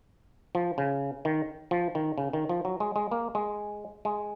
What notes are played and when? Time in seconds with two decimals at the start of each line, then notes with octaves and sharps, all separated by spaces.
0.55 F3
0.78 C#3
1.25 D#3
1.71 F3
1.95 D#3
2.18 C#3
2.33 D#3
2.49 F3
2.65 F#3
2.80 G#3
2.96 G#3
3.11 A#3
3.35 G#3
4.05 G#3